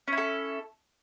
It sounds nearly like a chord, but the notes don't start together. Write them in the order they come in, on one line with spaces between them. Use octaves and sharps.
C#4 E4 A4